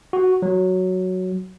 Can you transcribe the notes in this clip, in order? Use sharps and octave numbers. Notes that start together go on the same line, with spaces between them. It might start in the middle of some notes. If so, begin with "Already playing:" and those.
F#4
F#3